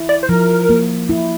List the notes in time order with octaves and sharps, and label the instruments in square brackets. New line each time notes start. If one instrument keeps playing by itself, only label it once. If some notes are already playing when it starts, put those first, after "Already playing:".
Already playing: [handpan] E4
[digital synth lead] D5
C5
[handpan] F3 [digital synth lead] A#4
[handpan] A#3
E4